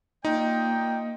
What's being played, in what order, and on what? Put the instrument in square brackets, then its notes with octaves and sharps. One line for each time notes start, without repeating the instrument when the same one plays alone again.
[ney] A#3 [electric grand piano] D#4 [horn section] F4 D5 G5